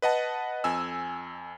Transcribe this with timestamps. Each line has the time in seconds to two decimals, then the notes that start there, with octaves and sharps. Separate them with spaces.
0.02 B4 D#5 F#5 A5
0.64 F2 G#5 E6